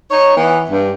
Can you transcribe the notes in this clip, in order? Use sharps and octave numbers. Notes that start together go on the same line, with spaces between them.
D#4 C#5
E3 B3
G2